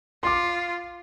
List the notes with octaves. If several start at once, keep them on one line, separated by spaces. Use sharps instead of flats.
F4 C6 D6